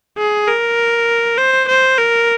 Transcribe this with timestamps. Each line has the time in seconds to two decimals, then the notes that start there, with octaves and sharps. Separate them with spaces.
0.18 G#4
0.48 A#4
1.38 C5
1.68 C5
1.98 A#4